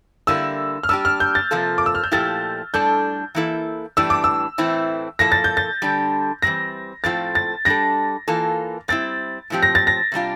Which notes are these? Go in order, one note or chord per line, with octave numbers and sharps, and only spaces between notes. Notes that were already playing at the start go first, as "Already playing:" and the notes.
D3 G3 A#3 E4 E6
F6
G3 D4 G4 E6
F6
G6
A6
C3 F3 A#3 F4 A4
D6
E6
F6
G6
A#2 F3 A3 E4 G4 A6
A2 G3 D4 A4 G6
E3 A#3 E4 A4
A2 E3 G3 D4 E6
D6
E6
A2 E3 A3 C4 E4
A#2 F3 A#3 E4 A4 A#6
A6
G6
A6
D3 G3 D4 A4
E3 G3 C4 A#6
A2 F3 C4 F4 A4 A6
A6
G3 D4 A4 A#6
E3 A#3 F4 A4
G3 C4 E4 A6
A2 F3 C4 G4
A#6
A6
A#6
C3 G3 D4 F4